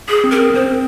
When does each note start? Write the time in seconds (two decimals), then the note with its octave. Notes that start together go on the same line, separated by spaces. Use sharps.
0.08 G#4
0.24 C4
0.31 A#4
0.54 C4 C5